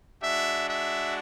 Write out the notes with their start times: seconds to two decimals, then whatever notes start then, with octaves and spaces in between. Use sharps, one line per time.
0.22 G#3 D4 F#4 E5
0.66 E5